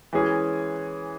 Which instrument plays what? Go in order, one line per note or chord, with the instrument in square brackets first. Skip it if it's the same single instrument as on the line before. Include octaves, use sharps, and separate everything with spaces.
[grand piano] E3 G#3 C#4 G#4